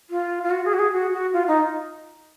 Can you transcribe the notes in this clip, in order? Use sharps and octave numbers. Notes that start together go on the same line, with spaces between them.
F4
F4
F#4
G#4
F#4
G#4
F#4
F#4
F4
D#4